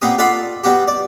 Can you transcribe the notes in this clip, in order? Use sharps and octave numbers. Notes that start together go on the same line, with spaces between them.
A#2 B3 C4 G4 D#6
F4 A4 D5 F#5 B5 C6
G3 B3 F#4 G4
D5